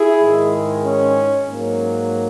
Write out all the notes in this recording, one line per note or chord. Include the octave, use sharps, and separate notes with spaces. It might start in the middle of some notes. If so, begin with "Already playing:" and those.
Already playing: E4 G#4
G#2 D#3 G#3
C#4
G#2 F#3 A#3